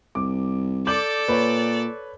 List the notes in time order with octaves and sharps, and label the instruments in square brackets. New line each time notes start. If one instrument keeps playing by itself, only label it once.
[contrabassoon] C2 [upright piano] D6
[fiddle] A4 D5 [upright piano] D6 G6 F#7
[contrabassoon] A#2 [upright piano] B4 C#5